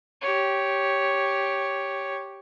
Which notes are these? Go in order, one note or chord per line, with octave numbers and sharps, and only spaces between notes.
G4 C#5